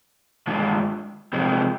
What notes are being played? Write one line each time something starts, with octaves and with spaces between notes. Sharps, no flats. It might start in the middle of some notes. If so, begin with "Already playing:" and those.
G2 D#3 G#3 D4 F4
C3 F3 G#3 C4